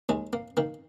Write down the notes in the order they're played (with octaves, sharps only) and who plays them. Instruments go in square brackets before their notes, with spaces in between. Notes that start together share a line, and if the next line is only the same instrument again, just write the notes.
[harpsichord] D#2 G#3
A#3
D#3 A#3